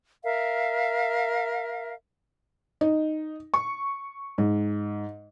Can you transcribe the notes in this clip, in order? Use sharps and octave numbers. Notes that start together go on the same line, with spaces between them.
A#4 E5 F5
D#4
C#6
G#2